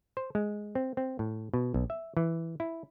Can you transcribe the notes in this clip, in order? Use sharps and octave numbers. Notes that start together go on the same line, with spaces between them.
C5
G#3
C4
C4
A2
B2
B1
E5
E3
E4